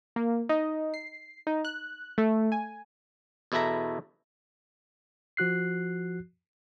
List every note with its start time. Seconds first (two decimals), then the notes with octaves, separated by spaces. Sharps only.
0.16 A#3
0.49 D#4
0.94 C7
1.47 D#4
1.65 F#6
2.18 A3
2.52 G#5
3.52 E2 B2 E4 A4 E5 A#5
5.37 F3 F#4 F#6 C7